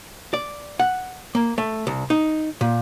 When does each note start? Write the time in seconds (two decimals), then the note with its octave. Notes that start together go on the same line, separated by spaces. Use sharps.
0.34 D5
0.80 F#5
1.35 A#3
1.58 A3
1.87 C2
2.10 D#4
2.61 A#2